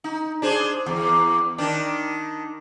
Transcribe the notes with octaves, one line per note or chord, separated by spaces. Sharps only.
D#4
D4 G#4 C5
E2
D#3 D4